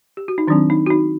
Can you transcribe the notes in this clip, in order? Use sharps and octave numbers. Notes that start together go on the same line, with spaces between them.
G4
F#4
D#4
D#3 F#3 C4 D4
D#4
F#4
D#4